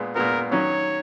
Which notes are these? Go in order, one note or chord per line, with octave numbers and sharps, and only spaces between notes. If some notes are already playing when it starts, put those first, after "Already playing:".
Already playing: A#2 G#3 B3
A#2 G#3 B3 A#4
D#3 F#3 C#4 C#5